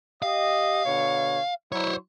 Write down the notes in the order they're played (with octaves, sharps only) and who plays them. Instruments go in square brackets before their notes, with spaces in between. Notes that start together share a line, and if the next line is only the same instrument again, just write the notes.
[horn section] G4 D#5 [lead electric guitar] F5
[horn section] B2 D3 C#5
[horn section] F#3 E4 [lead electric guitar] C5 C#5